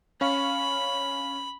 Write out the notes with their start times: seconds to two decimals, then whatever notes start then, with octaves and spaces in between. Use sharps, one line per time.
0.21 C#4 F5 B5 C#6